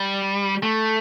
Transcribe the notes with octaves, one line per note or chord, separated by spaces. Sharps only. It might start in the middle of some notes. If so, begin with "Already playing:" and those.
Already playing: G3
A3